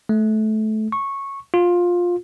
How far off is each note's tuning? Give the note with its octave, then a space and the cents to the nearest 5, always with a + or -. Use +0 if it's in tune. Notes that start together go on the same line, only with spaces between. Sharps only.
A3 -20
C#6 -10
F4 +15